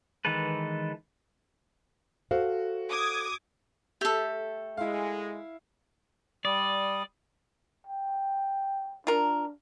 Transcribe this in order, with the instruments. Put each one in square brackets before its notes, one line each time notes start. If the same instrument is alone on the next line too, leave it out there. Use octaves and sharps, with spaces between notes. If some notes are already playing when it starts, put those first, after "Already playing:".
[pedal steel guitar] D#3 E3 G#3 A4 B4
[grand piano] F#4 [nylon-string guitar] A4 C5 F5
[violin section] D6 D#6 G#6
[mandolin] A3 [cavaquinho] G4 A4
[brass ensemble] G#3 [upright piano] E4 F5
[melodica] G3 D#6 [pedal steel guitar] D5
[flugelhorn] G5
[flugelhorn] D4 [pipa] F4 A#4